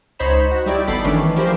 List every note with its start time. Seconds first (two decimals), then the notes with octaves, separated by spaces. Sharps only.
0.19 C#2 D#4 C5 C#5 B5 E7
0.51 F#4
0.66 G3 D#4 E4 G4 D5
0.87 G1 B3 A4 B5 D6 C7
1.04 D#3 E3 A3 C#4 D4
1.36 F3 E4 G4 A#4 C5